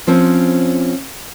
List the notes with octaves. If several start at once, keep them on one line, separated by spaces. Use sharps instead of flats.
F3 C4 C#4